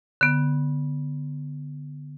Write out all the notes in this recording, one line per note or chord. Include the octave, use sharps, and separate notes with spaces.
D3 B3